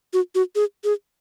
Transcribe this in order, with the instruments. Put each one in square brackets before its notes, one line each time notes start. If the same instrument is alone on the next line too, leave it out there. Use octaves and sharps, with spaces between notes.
[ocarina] F#4
F#4
G#4
G#4